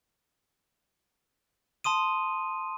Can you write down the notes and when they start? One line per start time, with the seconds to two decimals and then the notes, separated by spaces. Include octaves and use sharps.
1.84 A5 C6 D#6 D#7